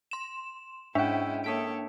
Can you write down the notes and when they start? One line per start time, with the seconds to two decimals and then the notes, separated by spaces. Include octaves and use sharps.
0.11 C6 E7
0.95 G#2 G#3 C#4 D4 E4 E5 F#5 G5
1.44 A#3 A4 C#5 D#6 B6 D7